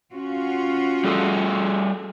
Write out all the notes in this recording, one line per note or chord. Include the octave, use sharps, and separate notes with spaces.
C#4 F4 F#4
G3 G#4 A4